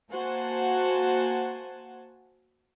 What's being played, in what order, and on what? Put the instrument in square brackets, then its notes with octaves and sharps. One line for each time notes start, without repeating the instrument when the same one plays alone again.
[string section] A#3 F#4 C5 F#5 G#5 A5